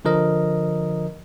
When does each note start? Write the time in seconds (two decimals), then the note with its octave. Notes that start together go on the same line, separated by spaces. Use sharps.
0.05 D3 F3 A#4 D#5